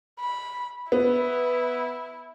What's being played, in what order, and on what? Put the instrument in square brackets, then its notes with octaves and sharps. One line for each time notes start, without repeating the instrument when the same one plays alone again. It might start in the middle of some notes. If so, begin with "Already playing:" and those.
[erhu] B5
[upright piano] B3 [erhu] E4